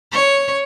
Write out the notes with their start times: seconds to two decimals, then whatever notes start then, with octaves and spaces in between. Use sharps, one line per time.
0.12 C#5